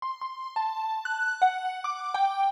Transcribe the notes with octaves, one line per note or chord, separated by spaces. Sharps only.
C6
C6
A5
F#6
F#5
D6
G5